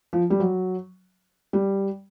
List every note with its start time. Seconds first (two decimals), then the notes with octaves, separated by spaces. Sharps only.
0.13 F3
0.30 G3
0.40 F#3
1.53 G3